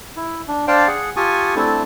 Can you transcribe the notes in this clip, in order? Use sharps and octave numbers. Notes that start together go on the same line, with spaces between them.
E4
D4
D4 C5 D5 F5 G5 A5
G#4 F#5
F4 G4 G#5 A5 C#6 D#6
A3 C4 D4 E4 A4 A5